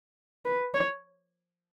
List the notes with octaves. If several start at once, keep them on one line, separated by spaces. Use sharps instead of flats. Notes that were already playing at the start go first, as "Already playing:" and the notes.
B4
C#5